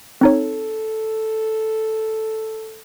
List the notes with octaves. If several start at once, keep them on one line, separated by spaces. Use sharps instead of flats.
C4 D#4 A4 C#5